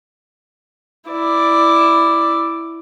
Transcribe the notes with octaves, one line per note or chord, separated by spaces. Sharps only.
E4 D5